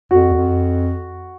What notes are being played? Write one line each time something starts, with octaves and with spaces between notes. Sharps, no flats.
F2 F#4
E2
F2